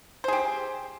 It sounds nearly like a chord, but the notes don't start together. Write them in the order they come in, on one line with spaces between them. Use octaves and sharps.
C5 G#4 G4